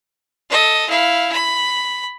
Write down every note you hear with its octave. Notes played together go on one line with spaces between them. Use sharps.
A4 D#5
E4 F5
B5